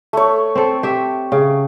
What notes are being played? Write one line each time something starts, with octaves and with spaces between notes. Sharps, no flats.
A3 C#5
C4 A4
G4 E5
C#3